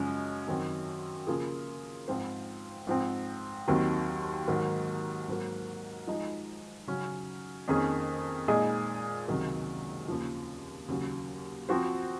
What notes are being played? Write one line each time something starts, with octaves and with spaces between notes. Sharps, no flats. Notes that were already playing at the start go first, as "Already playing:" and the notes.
Already playing: F#2 C#3 F3 G#3 C#4
F#2 D#3 F#3 C4
C#3 F3 A#3 F4 G#4
G#2 F3 C4 F4 C5
G#2 F3 C4
D#2 D#3 F#3 C4
G#2 D#3 F#3 A#3
G#2 F#3 A#3
F3 G#3 D#4
C#3 F#3 C#4
F2 D#3 A#3 C#4 G#4
A#2 G#3 D#4 G#4 D#5
C#2 C3 D#3 F#3
D#2 C#3 F3
D#2 C#3 F#3
F3 C4 F#4 C5